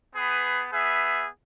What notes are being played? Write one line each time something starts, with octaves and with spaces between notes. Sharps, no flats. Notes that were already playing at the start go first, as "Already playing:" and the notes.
B3 G#4 B4
B3 G#4 B4 E5